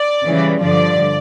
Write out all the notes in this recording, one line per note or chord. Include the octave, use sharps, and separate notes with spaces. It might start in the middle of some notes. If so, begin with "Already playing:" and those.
Already playing: D5
C#3 E3 G3
G2 D3 F3 D5